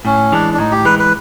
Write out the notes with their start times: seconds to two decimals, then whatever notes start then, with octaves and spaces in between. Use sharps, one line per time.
0.05 A2 C#4
0.32 E3 G#3 D4
0.53 D4
0.58 A2 D#4
0.72 G4
0.85 E3 G#3 B4
0.99 B4